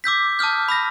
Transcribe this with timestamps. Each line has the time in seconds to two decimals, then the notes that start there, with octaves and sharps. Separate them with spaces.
0.04 D6 E6 G6 B6
0.39 A5 D6 D#6 F6 G6
0.68 B5 E6 A#6